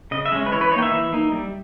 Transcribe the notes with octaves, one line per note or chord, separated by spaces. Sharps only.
C#3 D#5
E5
G#3 C#4
B4
E3 C#5
B4
A#3 D#4 C#5 G5
E5
E3
A#3 D#4
G3